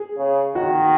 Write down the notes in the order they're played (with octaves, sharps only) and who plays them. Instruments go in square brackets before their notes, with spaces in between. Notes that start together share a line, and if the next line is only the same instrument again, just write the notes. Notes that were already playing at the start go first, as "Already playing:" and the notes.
Already playing: [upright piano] G#4
[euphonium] C#3
[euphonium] D#3 [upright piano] F#4